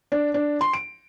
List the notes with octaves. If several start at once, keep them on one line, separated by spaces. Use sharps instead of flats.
D4
D4
C6
D7